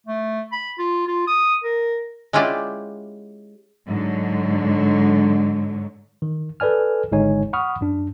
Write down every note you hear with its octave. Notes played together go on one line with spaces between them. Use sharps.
A3
B5
F4
F4
D#6
A#4
G#3 C#4 E4 F4 G4 D5
G#2 D3 F#3
D#3
A4 B4 D5 G#5 F6
G#1 D3 G#3 D#4 C#5 G#5
F#5 B5 C#6 D#6 F6
F#2 D4